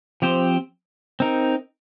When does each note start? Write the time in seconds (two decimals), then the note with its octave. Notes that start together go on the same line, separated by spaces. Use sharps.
0.22 F3 C4 G4 C5
1.20 C4 D#4 A#4